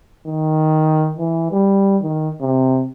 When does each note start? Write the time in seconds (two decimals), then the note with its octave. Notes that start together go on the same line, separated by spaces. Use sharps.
0.27 D#3
1.18 E3
1.51 G3
2.02 D#3
2.42 C3